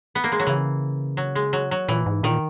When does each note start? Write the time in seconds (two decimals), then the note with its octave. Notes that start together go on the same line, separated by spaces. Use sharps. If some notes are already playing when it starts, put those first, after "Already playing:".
0.15 B3
0.24 A#3
0.32 G#3
0.39 F#3
0.47 C#3 E3
1.17 F#3
1.35 G#3
1.53 F#3
1.71 F#3
1.88 A#2 E3
2.06 G#2
2.23 A#2 D#3